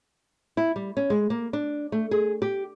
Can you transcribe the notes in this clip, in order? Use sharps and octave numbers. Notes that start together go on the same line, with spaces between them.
E4
G3
C#4
G#3
A#3
D4
A3
G#4
G4